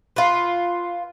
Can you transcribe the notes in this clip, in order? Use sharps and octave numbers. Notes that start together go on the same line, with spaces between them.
F4 B4